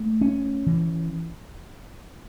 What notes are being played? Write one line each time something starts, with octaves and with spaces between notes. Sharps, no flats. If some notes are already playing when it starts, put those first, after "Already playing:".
Already playing: A3
C#4
E3